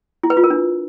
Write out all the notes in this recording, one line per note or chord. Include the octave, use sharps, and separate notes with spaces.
E4
B4
F4
A#4
D4